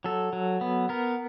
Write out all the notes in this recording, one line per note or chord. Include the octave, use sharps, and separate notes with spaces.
F#3 A4
F#3
B3
B3 A#4